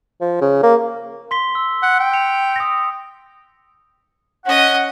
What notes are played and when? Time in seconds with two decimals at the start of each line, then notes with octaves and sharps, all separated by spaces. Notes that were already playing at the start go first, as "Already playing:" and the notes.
0.21 F3
0.41 C#3
0.63 A#3
1.31 C6 B6 G7
1.55 E6
1.82 F#5
1.99 G5
2.13 C#7 F7
2.56 D#6 A#6
4.46 C#4 D#5 F#5